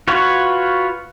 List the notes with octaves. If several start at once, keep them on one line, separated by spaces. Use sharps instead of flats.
F4 F#4 B4 C#5